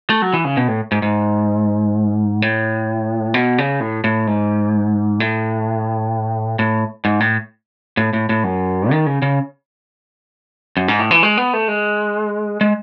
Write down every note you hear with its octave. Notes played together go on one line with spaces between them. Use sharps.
A3
F#3
E3
C#3
B2
A2
G#2
G#2
A2
B2
C#3
A2
A2
G#2
A2
A2
G#2
A2
A2
A2
A2
F#2
D#3
C#3
C#3
F#2
G#2
A2
E3
G#3
B3
A3
G#3
G#3